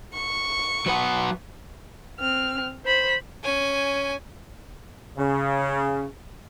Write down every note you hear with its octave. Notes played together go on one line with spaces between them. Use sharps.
C#6
F#3 B4 F#5
C4 F6
C5 B5
C#4 G#5
C#3